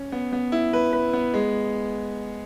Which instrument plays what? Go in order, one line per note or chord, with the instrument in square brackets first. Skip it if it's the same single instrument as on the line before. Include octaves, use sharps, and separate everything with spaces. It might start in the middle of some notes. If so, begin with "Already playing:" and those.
Already playing: [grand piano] C#4
B3
B3
E4
B4
B4
B3
G#3